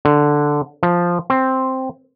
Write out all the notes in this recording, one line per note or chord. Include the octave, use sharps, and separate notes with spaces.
D3
F3
C4